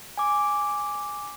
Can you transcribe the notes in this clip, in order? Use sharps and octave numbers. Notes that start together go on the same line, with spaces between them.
G#5 D6